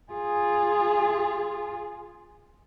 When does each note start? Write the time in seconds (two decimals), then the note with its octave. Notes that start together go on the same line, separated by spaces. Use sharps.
0.12 F4 G#4